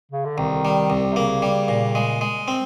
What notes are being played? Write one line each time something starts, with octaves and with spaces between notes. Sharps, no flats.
C#3
D3
C2 D#3
G3
C2
C3
C#3 A#3
G3
A#2
G#3
G#3
C4